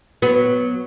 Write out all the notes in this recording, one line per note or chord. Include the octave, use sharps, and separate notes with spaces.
F#3 B3